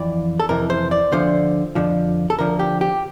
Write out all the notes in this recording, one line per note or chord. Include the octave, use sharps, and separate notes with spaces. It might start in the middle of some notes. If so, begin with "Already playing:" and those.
Already playing: F2 E3 D5
A4
F2 C3 E3 A#4
C5
D5
D2 D3 F3 C5
F2 D3 F3
A4
D2 D3 F3 A#4
G4
G4